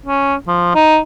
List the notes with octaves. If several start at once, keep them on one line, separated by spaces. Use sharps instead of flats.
C#4
F3
D#4